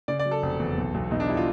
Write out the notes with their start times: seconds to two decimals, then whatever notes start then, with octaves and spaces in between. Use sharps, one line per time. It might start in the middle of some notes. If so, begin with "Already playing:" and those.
0.08 C#3 D5
0.19 D5
0.26 F#3
0.31 A4
0.43 F1
0.59 E2
0.78 B1
0.94 B1
1.11 B1 D#4
1.20 D4
1.29 G3 E4
1.37 F4